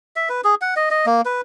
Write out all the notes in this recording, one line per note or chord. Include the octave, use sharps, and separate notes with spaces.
E5
B4
G#4
F#5
D#5
D#5
A#3
B4